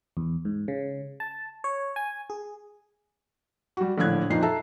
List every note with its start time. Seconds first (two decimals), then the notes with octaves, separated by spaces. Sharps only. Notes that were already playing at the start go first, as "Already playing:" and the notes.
0.17 E2
0.45 G#2
0.68 C#3
1.20 A5
1.64 C#5
1.96 G#5
2.30 G#4
3.77 G3 F#4
3.98 A#1 A2 D3 F#6 G#6
4.30 F2 A#2 D#4 C7
4.42 A4 E5 A5 A#5